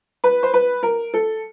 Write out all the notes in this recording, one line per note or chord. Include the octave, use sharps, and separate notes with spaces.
B4
C5
B4
A#4
A4